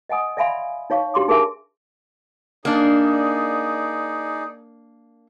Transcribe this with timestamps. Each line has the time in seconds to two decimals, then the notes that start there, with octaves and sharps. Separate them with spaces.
0.10 D#5 F#5 G#5 D#6
0.37 D5 E5 F5 G#5 B5 C6
0.90 D#4 C#5 F5 C#6
1.14 D4 G4 C6 D6
1.28 D#4 G#4 A#4 E5 G#5
2.65 A#3 D4 D#4 G#4 D5